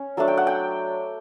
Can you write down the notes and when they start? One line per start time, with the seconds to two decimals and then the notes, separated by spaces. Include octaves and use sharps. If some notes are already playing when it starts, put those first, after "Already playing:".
Already playing: C#4
0.17 F#3 A3 D4 A5
0.28 G5
0.37 F#5
0.47 G5